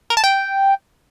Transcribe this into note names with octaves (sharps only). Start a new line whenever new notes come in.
A#4
A5
G5